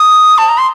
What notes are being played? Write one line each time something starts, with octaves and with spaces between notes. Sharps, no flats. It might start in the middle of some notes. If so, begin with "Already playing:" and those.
Already playing: D#6
A5
A#5
C6